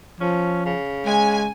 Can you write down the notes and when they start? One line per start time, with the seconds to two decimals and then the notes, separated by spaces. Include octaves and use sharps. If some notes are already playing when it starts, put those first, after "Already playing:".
0.20 F3 C#4
0.66 C#3
1.06 G#3 G#5